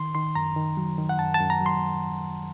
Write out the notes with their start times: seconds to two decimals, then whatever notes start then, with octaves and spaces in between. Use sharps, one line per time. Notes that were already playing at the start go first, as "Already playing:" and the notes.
Already playing: D#3 C6
0.15 D#3 C6
0.35 F#2 A#5
0.56 D#3
0.77 F#3
0.98 D#3
1.09 F#5
1.19 F#2 A5
1.34 A5
1.40 F#2
1.50 A#5
1.61 F#3
1.66 C6